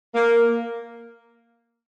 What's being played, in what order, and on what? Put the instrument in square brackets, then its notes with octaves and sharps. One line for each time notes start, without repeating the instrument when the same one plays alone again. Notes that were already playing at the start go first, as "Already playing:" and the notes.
[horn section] A#3